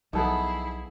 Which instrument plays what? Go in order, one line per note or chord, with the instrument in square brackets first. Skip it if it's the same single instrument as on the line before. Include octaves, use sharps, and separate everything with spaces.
[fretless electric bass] B1 F3 [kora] A#3 B3 [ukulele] D#4 A4 [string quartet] E4 G#4